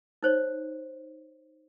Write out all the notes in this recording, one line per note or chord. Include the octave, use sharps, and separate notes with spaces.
D#4 C5 C#5